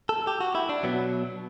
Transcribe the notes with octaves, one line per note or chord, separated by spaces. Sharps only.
A4
G4
F#4
E4
D4
B2 F#3 B3